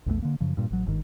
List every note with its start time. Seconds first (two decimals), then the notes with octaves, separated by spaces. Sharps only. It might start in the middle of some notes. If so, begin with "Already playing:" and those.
0.06 A#1 E2 E3 A3
0.22 D3 A#3
0.40 F#2 C#3 F3
0.57 G2 A#2
0.71 A1 F#3
0.86 G1 G#2 D#3